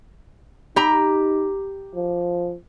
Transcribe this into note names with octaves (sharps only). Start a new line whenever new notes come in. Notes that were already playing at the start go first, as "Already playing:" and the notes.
D#4 G4 A#5
F3